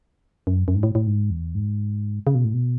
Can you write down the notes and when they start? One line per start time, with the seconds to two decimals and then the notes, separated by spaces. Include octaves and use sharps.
0.47 F#2
0.68 F#2
0.75 G#2
0.83 A2
0.95 A2
1.07 G#2
1.31 E2
1.55 G#2
2.27 C#3
2.35 B2
2.44 A2
2.54 B2